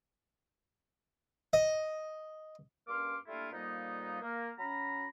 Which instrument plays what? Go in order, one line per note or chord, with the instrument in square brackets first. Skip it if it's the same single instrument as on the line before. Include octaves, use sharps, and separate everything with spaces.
[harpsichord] D#5
[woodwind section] G2 A#3 C#4 C6 D6 F6
G3 A3 A#3 D4 E4 F4
F2 A#2 G3 A#3 B3 D#4
A#3
F#3 C#4 A#5 B5